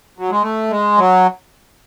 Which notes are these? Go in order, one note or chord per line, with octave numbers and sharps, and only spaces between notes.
F#3
G#3
A3
G#3
F#3